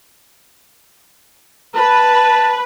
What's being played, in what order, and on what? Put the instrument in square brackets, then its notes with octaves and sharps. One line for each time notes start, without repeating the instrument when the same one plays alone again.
[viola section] B4 [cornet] A5